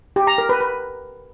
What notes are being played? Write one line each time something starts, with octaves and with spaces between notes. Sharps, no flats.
G4
A#5
A#4
B4
B4